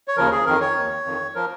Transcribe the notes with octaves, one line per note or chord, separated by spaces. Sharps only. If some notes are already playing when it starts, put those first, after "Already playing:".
C#5
D#2 C#3 F3 A#4
G#4
F2 D#3 A#4
C#5
D#2 D#3
F2 D#3
F3 A#4